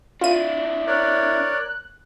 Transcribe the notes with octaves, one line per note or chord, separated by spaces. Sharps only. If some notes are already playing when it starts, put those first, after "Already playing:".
D4 E4 F4 D#7
A#4 C#5 D5 F#6